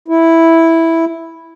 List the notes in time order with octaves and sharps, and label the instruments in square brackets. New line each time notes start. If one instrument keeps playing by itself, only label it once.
[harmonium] E4